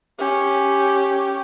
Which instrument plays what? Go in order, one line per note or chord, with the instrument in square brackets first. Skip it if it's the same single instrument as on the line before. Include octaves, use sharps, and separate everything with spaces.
[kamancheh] C#4 G4